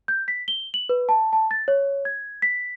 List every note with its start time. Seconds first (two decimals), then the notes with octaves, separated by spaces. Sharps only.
0.08 G6
0.28 B6
0.48 G7
0.74 F#7
0.89 B4
1.09 A5
1.33 A5
1.51 A6
1.68 C#5
2.05 G#6
2.42 B6